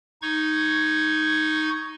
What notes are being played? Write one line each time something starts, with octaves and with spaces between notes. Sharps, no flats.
D#4 C#6 G#6